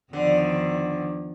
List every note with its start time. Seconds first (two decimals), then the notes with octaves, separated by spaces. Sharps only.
0.13 E2 D3 D#3 F3